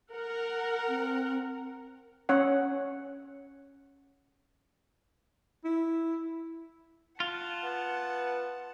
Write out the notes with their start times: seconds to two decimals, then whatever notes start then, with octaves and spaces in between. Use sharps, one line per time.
0.13 A#4 F#5
0.89 C4
2.29 C#4 C#5 F#5
5.65 E4
7.20 F4 F#5 A5
7.63 B3